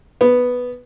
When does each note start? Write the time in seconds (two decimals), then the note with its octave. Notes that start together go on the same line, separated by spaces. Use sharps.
0.21 B3